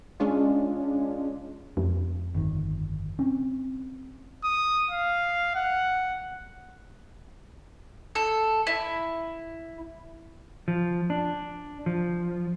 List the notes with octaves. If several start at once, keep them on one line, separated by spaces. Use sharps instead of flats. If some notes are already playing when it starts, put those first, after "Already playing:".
G#3 C#4 D4 F4
F2
G1 D#3
C4 C#4
D#6
F5
F#5
A4
E4
F3
D4
F3